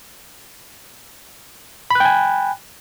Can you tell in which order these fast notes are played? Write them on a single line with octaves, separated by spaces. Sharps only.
B5 F#6 G5 G#5